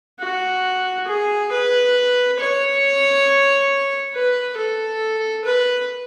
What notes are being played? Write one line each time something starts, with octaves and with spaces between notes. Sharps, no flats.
F#4
G#4
B4
C#5
B4
A4
B4